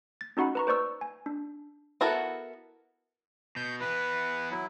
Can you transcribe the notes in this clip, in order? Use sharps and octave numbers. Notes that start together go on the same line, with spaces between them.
A6
C#4 D#4 F#4 F#5 B5
B4 A#5 C#6
B4 C5 D5 C#6 E6
G#5
D4
B3 E4 F#4 A4 A#4
B2 G6
E3 B3 B4
F#3 E4